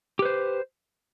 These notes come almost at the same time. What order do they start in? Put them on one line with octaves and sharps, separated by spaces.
G4 B4 C5